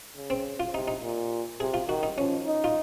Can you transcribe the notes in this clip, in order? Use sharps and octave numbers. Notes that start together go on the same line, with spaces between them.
C#3
C4
F4
C3 D#4
D#4
A#2
C3 G#4
F4
D#3 F#4
D#4
F3 C#4
D#4
F4